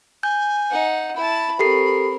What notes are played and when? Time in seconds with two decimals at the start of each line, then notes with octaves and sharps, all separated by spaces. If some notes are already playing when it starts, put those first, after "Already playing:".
0.23 G#5 G6
0.70 D#4 F#5
1.16 E4 A5 B5
1.59 C4 G4 A4 A#4 C7